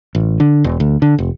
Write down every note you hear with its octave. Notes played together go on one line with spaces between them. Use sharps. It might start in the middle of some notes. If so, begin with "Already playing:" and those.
A1
D3
E1
D2
D3
F1